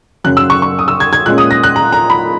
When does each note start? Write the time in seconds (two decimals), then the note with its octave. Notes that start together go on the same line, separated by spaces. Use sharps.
0.24 F#2 C#3 F#3 C#4 F#6
0.37 E6
0.50 C#6
0.62 C#6
0.79 D#6
0.88 E6
1.00 G#6
1.13 G#6
1.26 A#2 G#3 C#4 F#6
1.38 D#6
1.51 A#6
1.64 F#6
1.76 A#5
1.92 A#5
2.10 B5